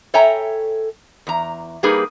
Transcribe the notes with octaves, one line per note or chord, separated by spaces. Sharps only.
A4 C#5 E5 G5 G#5 A#5
E2 A#5
G3 A#3 D#4 G#4 B4